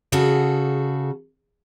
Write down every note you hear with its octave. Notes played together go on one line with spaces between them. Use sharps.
C#3 F#4 G#4 A4